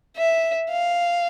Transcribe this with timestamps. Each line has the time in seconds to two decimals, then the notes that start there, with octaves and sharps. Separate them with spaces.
0.16 E5
0.70 F5